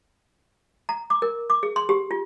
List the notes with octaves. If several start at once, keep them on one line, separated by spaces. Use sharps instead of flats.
A#5
D6
A#4
D6
G#4
C6
G4
F4